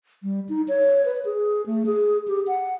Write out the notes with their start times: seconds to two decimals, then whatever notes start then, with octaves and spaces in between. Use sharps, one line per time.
0.23 G3
0.49 D#4
0.68 C#5
1.05 B4
1.25 G#4
1.66 A3
1.86 G#4
2.28 G4
2.47 F#5